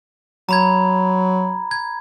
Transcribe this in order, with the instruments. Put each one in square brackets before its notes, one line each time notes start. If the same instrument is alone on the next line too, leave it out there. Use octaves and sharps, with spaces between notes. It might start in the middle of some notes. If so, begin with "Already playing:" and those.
[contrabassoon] F#3 [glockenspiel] A#5 B5 G#6
[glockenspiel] G#6